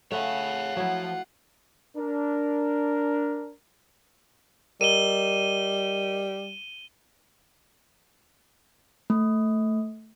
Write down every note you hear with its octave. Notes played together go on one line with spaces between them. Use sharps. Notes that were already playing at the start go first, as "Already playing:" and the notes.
A3 F4 C#5 F5 F#5
F3 F#3 E4
D4 A#4
G3 A#4 D#5 D#7 E7 G7
A3